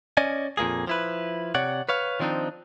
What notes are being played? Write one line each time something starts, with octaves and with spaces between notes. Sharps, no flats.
C#4 D5 D#5 G#5
F2 A#2 A#3 G#4
F3 E4 B4
C3 C#5 D5 F#5
B4 C#5 F5
D#3 F3 C4 D4 D#4